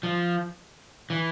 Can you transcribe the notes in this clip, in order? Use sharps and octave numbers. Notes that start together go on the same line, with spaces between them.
F3
E3